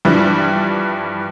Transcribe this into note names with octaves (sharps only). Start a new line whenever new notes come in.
G2 E3 F3 G3